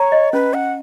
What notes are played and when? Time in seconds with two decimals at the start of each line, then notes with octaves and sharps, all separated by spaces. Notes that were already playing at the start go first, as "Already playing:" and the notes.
Already playing: C#5 A#5
0.12 D#5
0.33 C#4 B4
0.53 C#4 F#5